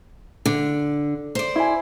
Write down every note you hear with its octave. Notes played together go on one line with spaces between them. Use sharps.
D3
C5 D5
E4 G#5